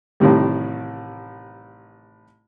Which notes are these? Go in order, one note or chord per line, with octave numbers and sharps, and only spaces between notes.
A1 A2 C3 D#3 G3